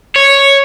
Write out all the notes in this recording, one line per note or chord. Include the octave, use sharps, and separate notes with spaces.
C#5